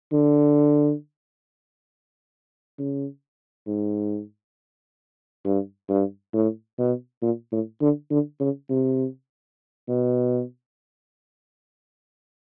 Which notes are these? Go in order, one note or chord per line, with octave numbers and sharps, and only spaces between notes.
D3
C#3
G#2
G2
G2
A2
B2
A#2
A2
D3
D3
C#3
C3
B2